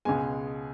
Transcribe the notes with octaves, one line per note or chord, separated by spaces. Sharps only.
C#2 B2 G#3 G#5